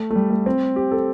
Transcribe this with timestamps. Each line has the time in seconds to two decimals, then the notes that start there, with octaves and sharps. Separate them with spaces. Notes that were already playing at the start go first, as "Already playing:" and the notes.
Already playing: A3
0.10 A3
0.16 G3
0.30 A3
0.46 C4
0.76 G4
0.91 A4